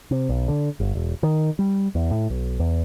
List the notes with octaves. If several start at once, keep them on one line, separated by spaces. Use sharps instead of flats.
C3
B1
D3
G1
E1
D#3
G3
E2
A2
B1
E2